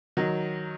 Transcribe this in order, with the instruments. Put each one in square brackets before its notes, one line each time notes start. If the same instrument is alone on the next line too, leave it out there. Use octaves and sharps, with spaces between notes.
[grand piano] D#3 F#3